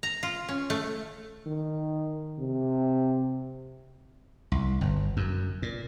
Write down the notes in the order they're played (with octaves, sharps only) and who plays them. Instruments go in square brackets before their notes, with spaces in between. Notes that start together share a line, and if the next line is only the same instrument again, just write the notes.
[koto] A#5
F4
C#4
A3
[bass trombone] D#3
C3
[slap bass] C2
G1
F#2
A#2